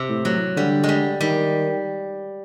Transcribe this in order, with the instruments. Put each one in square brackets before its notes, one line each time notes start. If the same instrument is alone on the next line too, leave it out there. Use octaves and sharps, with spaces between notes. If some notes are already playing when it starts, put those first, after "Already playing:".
Already playing: [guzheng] C3
[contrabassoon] A2
[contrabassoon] A2 [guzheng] F#3
[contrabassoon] D3 [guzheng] G3
[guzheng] G#3
G3
[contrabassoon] D#3 [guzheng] G3